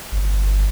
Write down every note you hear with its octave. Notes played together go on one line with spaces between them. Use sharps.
G1